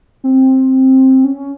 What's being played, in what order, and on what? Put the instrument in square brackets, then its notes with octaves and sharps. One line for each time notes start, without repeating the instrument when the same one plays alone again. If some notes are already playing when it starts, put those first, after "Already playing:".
[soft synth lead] C4
C#4